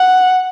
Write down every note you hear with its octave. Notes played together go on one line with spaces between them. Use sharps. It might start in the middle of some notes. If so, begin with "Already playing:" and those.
Already playing: F#5